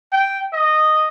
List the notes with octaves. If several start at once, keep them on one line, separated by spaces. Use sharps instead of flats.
G5
D#5